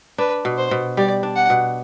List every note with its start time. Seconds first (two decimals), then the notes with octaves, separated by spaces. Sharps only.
0.18 D4 B4
0.45 B2
0.58 C5
0.71 B2
0.97 G3 D5
1.23 D4
1.36 F#5
1.50 B2